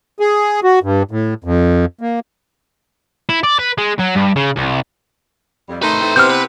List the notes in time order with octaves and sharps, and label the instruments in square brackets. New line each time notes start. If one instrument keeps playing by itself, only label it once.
[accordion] G#4
F#4
G2
A2
F2
A#3
[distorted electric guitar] E4
D5
B4
G#3
F#3
G2
C#3
C2
[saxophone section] F2 G3
[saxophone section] C3 D#3 A3 [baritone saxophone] D#4 [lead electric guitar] B4 C6
[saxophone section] A3 C4 E4
[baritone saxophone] C3 [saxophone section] B3 E4 C5 [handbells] F6 G6
[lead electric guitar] B4